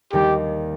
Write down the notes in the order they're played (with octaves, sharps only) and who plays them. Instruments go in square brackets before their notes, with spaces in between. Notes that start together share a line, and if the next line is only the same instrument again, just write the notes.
[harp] D#2 D#3 G3 D#4 [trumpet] G4